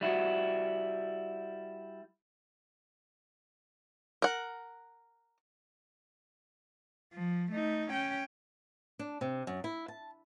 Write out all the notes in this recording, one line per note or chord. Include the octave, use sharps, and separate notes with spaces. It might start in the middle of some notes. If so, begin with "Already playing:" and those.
G3 E4 F#4
A#4 F#5
F3
A3 D#4
C#4 G5
D4
C3
F#2
E4
A5